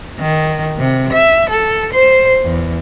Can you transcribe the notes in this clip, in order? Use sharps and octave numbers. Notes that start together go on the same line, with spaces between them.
D#3
C3
E5
A4
C5
E2